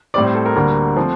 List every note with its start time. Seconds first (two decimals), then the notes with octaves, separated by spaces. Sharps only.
0.14 A2 G3 C4 D5
0.24 C5
0.35 A4
0.46 A#4
0.56 D2 D3 G3 A#3
0.96 F3 A3 C4